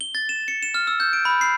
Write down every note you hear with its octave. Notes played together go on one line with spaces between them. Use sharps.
G7
A6
E7
C#7
E7
F6
E6
G6
D7
B5
C7